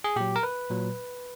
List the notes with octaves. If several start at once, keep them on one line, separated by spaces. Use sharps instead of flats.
G#4
A#2 F#3 G4
A#4
B4
A#2 F#3